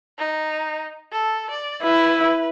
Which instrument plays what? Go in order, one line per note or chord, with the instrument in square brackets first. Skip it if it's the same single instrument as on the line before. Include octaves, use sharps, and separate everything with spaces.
[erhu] D#4
A4
D5
[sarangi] E4 [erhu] B4